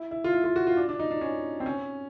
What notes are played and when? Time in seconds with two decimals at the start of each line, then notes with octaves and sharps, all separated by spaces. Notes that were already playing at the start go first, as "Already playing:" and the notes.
Already playing: E4
0.11 E4
0.24 F4
0.33 E4
0.44 F4
0.56 F#4
0.67 F4
0.77 D4
0.89 D4
0.99 D#4
1.11 D4
1.21 C#4
1.60 C4
1.66 C#4